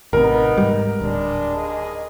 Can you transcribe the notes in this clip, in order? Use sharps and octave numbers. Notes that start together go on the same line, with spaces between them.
A1 C3 B3 D#4 A#4
G#2 G3
D1 G3 G#3 D4
D#2 G#4 D#5